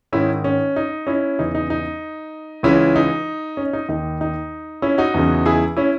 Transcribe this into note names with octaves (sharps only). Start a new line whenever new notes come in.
G#2 D#3 C#4 E4
C#4
D#4
C#4 E4
E2 C#3 E3 D#4
D#4
D#4
C#2 C#3 E3 C#4 E4
D#4
C#4
D#4
D#2 D#3 D#4
D#4
C#4 E4
D#4 F#4
E2 C#3 E3
E4 G#4
C#4 E4